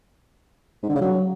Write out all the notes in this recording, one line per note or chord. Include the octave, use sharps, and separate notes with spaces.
G#2
D3
C#3
F#3